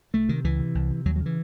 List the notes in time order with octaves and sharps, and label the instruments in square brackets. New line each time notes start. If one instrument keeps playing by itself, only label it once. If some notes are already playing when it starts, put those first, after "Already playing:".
[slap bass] C2 A3
C3 D#3
C#2 E3
C3
C2
C3
D#2 F#3
F#3
C#3
E3